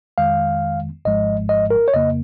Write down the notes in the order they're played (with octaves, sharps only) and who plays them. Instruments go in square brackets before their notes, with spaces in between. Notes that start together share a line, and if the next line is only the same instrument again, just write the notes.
[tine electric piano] F2 D#3 G#3 F5
G#1 G#2 F3 G#3 D#5
D#5
A#4
C#5
F2 C#3 A#3 D#5